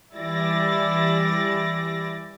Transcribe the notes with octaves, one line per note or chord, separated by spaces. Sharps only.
E3 G3 E4 D5 A6 A#6